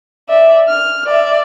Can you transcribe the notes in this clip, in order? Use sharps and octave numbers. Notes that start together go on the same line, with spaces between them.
D5 E5
F6
D5 E5